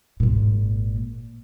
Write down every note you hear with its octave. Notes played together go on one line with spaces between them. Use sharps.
G#1 A#2